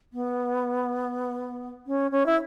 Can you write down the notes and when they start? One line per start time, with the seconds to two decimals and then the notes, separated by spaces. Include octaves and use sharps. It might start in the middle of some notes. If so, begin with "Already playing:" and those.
0.13 B3
1.87 C#4
2.11 C#4
2.26 E4